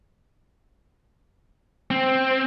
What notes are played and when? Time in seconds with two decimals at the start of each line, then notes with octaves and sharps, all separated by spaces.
1.91 C4